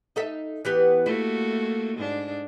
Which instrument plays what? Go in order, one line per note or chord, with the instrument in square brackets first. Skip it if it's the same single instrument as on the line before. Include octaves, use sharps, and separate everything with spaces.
[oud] D#4 A4 E5
E3 B3 G4
[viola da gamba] A3 A#3 F#4 [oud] E4
[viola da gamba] G#2 D4